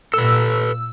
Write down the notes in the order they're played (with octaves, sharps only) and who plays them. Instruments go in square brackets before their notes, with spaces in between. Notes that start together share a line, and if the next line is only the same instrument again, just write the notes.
[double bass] A#2 [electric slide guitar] A4 B4 [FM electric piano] E6